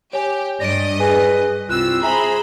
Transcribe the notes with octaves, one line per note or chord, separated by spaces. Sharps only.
G4 C#5 G#5
G2 D5 D#5 A#6 D7
G#4 B4 G#5
C2 C4 E4 F4 E6 F#6
G#4 C5 E5 G#5 A#5 B5